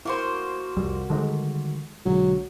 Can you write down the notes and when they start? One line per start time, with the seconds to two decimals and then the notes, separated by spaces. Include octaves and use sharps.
0.05 A#3 E4 F#4 C5
0.77 C2 F2 G3
1.10 D3 D#3 G3 G#3 D#4 A4
2.06 B1 D3 F#3 G#3